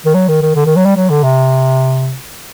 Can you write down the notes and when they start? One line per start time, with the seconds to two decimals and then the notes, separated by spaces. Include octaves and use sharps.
0.05 D#3
0.14 F#3
0.28 D#3
0.42 D#3
0.56 D3
0.66 D#3
0.76 F#3
0.86 G3
0.96 F#3
1.10 D3
1.23 C3